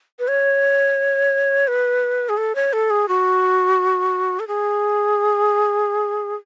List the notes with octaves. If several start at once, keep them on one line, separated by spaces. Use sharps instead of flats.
B4
C#5
B4
G#4
A4
C#5
A4
G#4
F#4
A4
G#4